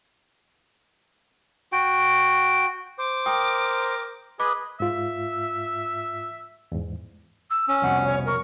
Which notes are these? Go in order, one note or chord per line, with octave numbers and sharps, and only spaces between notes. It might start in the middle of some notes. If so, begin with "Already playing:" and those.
F#4 G5
C5 D6
A#4 G5 D#6
G#4 B4 D#5 B5 D6
G#2 F4 E5
E2 G#2
E6
C#4 E6
C2 F2 B2 F#5
C#5
A#4 C#6